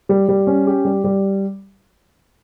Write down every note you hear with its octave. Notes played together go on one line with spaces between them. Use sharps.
G3
G3
C#4
G4
G3
G3